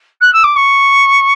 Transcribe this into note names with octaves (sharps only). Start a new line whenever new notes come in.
F#6
E6
D6
C#6